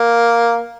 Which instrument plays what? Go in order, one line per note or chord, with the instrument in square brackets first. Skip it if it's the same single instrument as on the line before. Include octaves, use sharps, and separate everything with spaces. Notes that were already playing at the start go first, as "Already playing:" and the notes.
Already playing: [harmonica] A#3